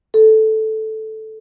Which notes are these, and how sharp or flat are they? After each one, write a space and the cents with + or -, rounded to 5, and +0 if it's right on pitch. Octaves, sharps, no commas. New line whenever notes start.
A4 -5